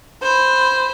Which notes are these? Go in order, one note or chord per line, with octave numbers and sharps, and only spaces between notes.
C5 B5